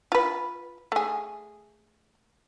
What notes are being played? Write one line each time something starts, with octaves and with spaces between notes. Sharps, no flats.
F4 B4
A3 G#4